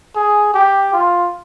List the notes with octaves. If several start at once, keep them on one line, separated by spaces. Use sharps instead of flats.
G#4
G4
F4